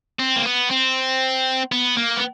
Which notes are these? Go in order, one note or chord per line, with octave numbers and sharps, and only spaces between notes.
C4
A#3
B3
C4
B3
A#3
B3